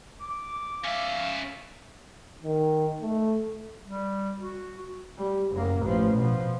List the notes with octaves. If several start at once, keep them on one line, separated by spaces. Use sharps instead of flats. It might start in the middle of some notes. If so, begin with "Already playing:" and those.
D6
C#4 E5 F5
D#3
A3
G3
F#4
G3
F#1 A#3
A1 F3
B2 F3